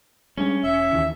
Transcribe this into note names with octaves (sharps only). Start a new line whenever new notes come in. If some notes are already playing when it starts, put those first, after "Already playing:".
G3 G#3 C#4 D4
E1 E5
D#2 D#3 E3